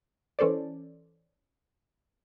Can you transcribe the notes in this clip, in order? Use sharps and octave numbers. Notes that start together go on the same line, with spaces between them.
E3 C#4 A4 C5 D5